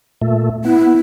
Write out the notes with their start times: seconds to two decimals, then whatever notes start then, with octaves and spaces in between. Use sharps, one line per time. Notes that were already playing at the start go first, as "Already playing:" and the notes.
0.21 A#2 A3
0.65 B3 E4